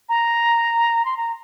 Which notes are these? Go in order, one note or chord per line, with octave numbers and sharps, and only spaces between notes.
A#5
C6
A#5